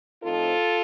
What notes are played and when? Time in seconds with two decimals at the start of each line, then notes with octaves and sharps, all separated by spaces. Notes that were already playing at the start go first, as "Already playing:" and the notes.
0.24 A2 F3 C4 D#4 F4 A4